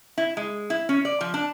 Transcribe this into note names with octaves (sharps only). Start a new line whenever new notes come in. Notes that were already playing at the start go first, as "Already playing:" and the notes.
E4
G#3
E4
C#4
D5
F3
D4